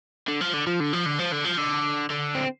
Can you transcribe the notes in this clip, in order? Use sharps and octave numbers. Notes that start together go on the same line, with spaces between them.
D3
F3
D3
F3
D3
F3
D3
F3
D3
F3
D3
D3
C4